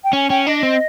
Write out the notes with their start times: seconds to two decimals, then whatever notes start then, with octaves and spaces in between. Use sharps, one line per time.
0.04 G5
0.13 C#4 G#5
0.29 C#4 G5
0.46 D4 D#5
0.63 C4